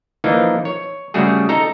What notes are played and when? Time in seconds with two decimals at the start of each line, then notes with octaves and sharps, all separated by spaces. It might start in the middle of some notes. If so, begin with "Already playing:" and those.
0.24 E3 F3 A#3 D4 D#4
0.65 C#5
1.14 C#3 G3 A3 F#4 G#4
1.49 D#4 A4 A#5